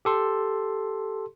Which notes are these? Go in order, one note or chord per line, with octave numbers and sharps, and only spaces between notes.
G4 A4 C6